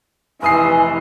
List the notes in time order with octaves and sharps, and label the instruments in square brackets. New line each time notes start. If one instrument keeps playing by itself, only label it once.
[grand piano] F1 D#6 C7 [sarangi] E3 [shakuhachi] G#5